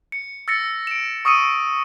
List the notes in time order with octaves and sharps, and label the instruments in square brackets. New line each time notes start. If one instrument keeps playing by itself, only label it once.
[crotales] C#7
E6 A6 A#6 C#7
D7 E7
C#6 D#6 E6 C#7 D#7